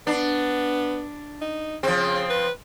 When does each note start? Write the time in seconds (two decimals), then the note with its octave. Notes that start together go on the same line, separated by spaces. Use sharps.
0.07 B3 D4
1.41 D#4
1.83 C#3 F3 C4
2.30 B4